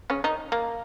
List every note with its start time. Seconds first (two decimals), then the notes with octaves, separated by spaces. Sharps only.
0.10 C#3 C#4
0.24 D#3 D#4
0.52 A#3